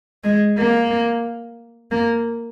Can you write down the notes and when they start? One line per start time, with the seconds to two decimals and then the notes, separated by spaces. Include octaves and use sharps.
0.24 G#3
0.57 A#3
1.91 A#3